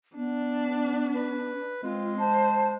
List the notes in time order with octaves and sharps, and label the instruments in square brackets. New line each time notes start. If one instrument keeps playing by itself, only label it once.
[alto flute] B3 [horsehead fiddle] D4
[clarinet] B4
[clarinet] G#3 [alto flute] C4 [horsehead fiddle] F4
[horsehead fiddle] C5 [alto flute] A5